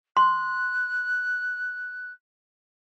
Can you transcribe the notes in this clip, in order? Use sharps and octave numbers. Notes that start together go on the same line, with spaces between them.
C6 F#6